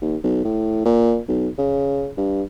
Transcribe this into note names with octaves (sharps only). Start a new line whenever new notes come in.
D#2
B1
A2
A#2
B1
C#3
G2